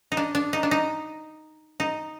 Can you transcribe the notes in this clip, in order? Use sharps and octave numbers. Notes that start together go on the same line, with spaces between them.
D#4
D4
D4
D#4
D4
D#4
D#4